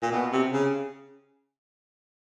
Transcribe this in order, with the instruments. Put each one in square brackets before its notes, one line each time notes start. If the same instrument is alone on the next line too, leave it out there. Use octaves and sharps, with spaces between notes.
[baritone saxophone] A#2
B2
C3
C#3